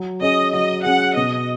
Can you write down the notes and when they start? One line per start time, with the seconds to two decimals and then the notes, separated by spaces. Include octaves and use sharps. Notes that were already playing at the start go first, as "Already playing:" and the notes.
Already playing: F#3
0.21 C#4 G#4 D#5
0.53 F#3 D#5
0.84 C#4 G#4 F#5
1.16 B2 D#5